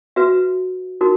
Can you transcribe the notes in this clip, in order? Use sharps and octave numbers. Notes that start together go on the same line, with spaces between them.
F#4 B4 E5
D#4 F#4 A#4